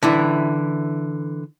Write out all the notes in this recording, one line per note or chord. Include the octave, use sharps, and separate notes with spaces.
D3 E3 E4